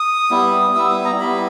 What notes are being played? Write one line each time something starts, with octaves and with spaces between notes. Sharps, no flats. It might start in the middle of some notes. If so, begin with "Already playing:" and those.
Already playing: D#6
G3 B3 E4
G3 B3 E4 E6
D#6
A#5
G3 B3 E4 B5